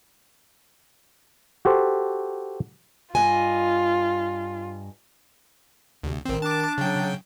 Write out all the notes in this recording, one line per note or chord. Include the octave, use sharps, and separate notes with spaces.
F#4 G4 A4 C5
G2 F4 D#5 G#5
D2 C3
A1 D#3 C4
D4 A5 D6
C#3 F#3 G5